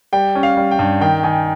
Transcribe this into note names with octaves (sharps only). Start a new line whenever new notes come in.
G3 G5
C#4
F5
G3
G5
G2
D#3 G5
D#3 G#5